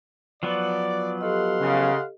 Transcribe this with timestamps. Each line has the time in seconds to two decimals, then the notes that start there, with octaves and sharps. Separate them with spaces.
0.43 F3 F#3 B3 D5
1.21 G4 A4 D#5 F5 F#5 C6
1.60 C#3